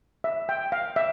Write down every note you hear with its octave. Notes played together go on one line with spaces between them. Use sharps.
E5
G5
F5
E5